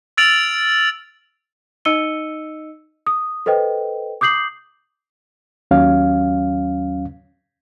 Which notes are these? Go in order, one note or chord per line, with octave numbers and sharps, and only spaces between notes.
E6 F6 A6 D7 F7 F#7
D#4 D#5 E6 C#7 D#7 G7
D#6
A4 B4 C5 D#5 G5
D6 D#6 G6 C7 F#7
D#2 F#3 C#4 F5